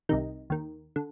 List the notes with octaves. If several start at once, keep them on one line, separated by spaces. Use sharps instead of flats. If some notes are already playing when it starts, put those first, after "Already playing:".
C2 C3 D#3 D#4
D#2 D#3
D3